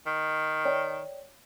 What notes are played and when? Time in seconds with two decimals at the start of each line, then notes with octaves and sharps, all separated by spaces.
0.06 D#3
0.65 C#5 D5 G5